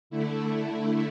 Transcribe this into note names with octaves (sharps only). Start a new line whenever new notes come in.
D3 A3 E4